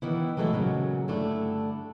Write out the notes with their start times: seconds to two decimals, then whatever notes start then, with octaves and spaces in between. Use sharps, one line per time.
0.02 D#3 E3 B3 E4
0.37 E3 F#3 G#3 A3 E4
0.53 A#2 C#3 F#3
1.08 G2 D3 A3 D4 E4